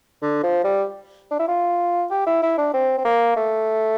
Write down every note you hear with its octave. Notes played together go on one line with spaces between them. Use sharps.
D3
F3
G3
D4
E4
F4
G4
E4
E4
D4
C4
C4
A#3
A3